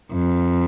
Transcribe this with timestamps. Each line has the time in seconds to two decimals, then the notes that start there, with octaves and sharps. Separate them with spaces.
0.13 F2